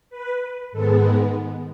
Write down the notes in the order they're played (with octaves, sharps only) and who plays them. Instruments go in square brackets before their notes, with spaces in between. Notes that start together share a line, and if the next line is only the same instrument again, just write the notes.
[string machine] B4
G#2 D#3 G#3 B3 A4